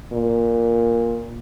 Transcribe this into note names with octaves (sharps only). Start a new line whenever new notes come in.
A#2